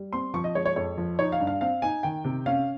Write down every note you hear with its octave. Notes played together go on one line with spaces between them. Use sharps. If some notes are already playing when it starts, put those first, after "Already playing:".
Already playing: G3
C4 C6
F3 C#6
D#5
G#3 C#5
C#5
F2 C#5
F3
D#4 C#5
F5
G2
F5
C4 F5
D#4 G#5
D#3 G5
C3
C#4 F5